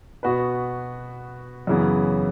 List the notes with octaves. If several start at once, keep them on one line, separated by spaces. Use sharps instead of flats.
B2 B3 F#4 B4
F#2 C#3 E3 B3